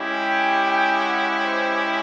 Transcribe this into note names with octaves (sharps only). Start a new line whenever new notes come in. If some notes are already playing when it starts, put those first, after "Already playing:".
Already playing: G#3 C#4 E4 G4
G5
G5
F#5
C5